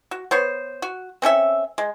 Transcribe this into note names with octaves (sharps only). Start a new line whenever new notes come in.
F#4
B3 C5 C#5
F#4
C4 C#4 A4 E5
G#3